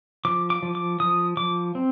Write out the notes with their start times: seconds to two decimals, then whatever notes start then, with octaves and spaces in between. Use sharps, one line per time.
0.25 F3 D6
0.50 D6
0.62 F3
0.75 D6
1.00 F3 D#6
1.37 F3 D6
1.75 C4